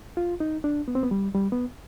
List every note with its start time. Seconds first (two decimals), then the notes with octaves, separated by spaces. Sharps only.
0.17 F4
0.40 D#4
0.64 D4
0.88 B3
0.95 C4
1.03 B3
1.11 G3
1.35 G3
1.52 B3